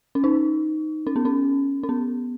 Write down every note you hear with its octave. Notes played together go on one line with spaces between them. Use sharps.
C#4
D#4
C#4
B3
C#4
C#4
B3